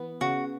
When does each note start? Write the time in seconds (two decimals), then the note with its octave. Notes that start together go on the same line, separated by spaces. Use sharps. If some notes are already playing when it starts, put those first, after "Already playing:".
Already playing: E3 B3
0.21 C#3 F#4